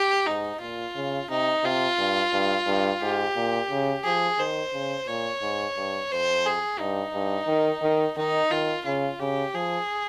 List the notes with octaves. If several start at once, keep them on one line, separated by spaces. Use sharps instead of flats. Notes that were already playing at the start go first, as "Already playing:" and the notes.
Already playing: G4
G#2 D#4
A#2 F4
C#3
C3 D#4
C3 F4
G2
G2
G2
G#2 G4
A#2
C#3
F3 G#4
D#3 C5
C#3
A#2 C#5
G#2
G2
F2 C5
G#4
G2 D#4
G2
D#3
D#3
D#3 D#4
D#3 F4
C#3 F4
C#3 G4
F3 G#4